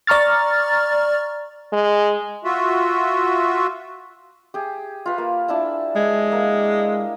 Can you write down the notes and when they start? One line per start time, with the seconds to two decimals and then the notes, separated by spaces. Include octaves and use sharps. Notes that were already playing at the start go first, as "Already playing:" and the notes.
0.07 D5 A#5 C#6 F6 A6
1.73 G#3
2.45 F4 F#4 E5
4.54 G4 G#4
5.06 F4 B4
5.18 A#3
5.48 D4 E4 A5
5.96 G#3
6.32 A#3